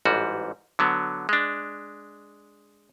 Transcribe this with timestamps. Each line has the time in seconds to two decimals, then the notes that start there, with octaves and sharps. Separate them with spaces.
0.05 A1 G#2 G3 F#4
0.79 D3 F#3 B3
1.29 G#3 D4